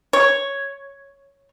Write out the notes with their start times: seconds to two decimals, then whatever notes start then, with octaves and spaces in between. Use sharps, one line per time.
0.13 C#5